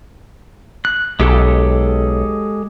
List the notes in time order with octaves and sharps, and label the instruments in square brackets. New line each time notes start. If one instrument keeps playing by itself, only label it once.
[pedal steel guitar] F#6
[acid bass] B1 [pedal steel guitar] G#3 G4 A4